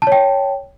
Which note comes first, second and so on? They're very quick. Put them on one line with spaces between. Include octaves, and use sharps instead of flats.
A5 C#5 G5